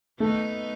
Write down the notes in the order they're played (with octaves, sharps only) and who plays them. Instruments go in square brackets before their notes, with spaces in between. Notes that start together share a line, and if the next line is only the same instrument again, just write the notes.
[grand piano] A3 [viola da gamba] B3 D#4